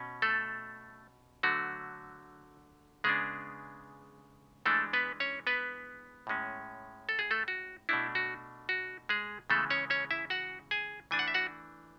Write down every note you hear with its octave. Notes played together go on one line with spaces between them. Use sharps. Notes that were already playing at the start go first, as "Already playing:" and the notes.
Already playing: B2 C#4
A3 A4
D3 F#3 A3 F#4
C#3 G#3 B3 D4 G#4
E3 G#3 A3 D4 A4
B3 B4
C#4 C#5
B3 B4
A2 G#3 C#4
A4
G#4
A3 A4
F#4
B2 A3 D4 E4
F#4
F#4
G#3 G#4
C#3 E3 G#3 A3 B3 A4
C#4 C#5
C#4 C#5
E4 E5
F#4 F#5
G#4 G#5
E3 A3 D4 G#5
F#5
E5
F#4 F#5